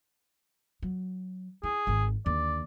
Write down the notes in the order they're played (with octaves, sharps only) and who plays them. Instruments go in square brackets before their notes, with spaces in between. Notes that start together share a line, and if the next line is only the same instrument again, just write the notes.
[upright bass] F#3
[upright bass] E4 [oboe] G#4
[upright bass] G#1 D#3
[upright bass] D#2 D3 [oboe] D5